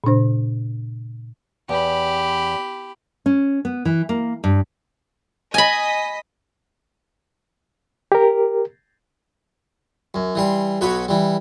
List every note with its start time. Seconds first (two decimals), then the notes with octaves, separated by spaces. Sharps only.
0.04 A#2 C#3 D4 C5
1.69 E2 G4 B5
3.26 C#4
3.65 B3
3.85 E3
4.09 A#3
4.44 G2
5.54 D#5 G#5 B5 B6
8.12 G4 A#4
10.14 F#2
10.35 E3 G3 C6
10.81 B1 B2 F#4 B4 C#5
11.08 E3 G3